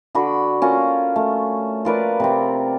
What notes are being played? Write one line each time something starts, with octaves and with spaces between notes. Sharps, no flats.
D3 F#4 B5
C#4 F4 A#4
A3
F4 A#4 B4 D5
C3 C4